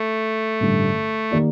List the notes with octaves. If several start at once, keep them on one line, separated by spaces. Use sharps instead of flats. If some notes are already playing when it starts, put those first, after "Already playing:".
Already playing: A3
A1 G2 D3 G3
D#3 A#3 D#4 G4 D5